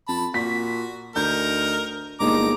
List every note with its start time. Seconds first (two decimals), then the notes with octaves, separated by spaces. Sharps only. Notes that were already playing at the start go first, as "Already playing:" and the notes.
0.08 F2 A5 B5
0.34 A#2 F#4 B6
1.16 D2 D#4 A#4 G6
2.20 G1 G#3 A#3 D#4 A#5 D6